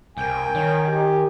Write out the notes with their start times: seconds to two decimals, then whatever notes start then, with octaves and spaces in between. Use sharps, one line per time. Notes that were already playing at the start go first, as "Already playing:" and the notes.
0.17 C2 A#4 G5 G#5
0.55 D#3 C#5
0.88 G4